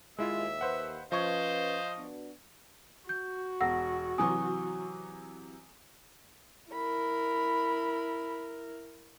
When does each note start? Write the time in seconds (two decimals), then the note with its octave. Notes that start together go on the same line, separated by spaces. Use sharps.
0.18 D#2 G#3 E4 F4 E5
0.61 B4 C5 F#5
1.12 F3 C#4 B4 C5 D#5 F5 C#6 G#6
1.97 B3 D4 F#4
3.09 F#4 G6
3.61 E1 F#5 E6 A#6
4.18 C3 E3 F#3 G#5 D#6
6.72 E4 A#4 B5